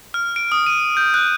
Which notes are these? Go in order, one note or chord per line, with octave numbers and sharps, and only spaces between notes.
F6
D7
D#6
D#7
G6
F#6